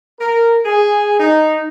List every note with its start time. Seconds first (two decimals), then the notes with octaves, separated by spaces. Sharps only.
0.20 A#4
0.65 G#4
1.19 D#4